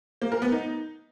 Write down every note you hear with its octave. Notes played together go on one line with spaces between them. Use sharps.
A#3
A#4
B3
D#4